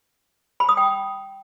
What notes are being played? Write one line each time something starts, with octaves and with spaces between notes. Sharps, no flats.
B5
D#6
G5